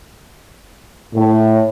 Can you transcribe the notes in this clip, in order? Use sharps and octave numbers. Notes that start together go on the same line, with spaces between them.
A2